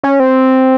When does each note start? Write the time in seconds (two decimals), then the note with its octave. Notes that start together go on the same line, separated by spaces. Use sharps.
0.03 C#4
0.20 C4